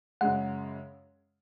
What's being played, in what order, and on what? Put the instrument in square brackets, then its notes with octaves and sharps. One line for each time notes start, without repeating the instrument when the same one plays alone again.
[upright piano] F#2 C#3 G#3 [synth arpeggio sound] F#5